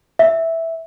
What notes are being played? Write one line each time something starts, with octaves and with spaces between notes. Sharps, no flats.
E5